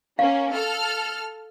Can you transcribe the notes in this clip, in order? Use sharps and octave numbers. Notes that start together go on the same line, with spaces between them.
A#3 C#4 F5
A4 F6